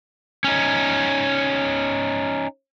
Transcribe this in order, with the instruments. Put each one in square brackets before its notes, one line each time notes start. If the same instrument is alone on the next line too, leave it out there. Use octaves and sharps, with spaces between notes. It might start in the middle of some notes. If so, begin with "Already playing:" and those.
[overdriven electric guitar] C#4 D#4